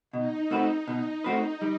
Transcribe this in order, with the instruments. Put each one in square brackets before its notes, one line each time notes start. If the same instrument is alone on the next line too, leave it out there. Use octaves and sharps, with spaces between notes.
[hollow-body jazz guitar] B2 [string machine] D#4
[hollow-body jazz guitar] A3 C4 F#4 B4
B2
A3 C4 F#4 B4
G3